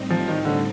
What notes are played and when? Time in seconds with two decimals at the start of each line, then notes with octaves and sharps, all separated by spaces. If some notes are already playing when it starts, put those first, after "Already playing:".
Already playing: A2 G3 C4 D#4
0.10 F3
0.28 D#3
0.45 D3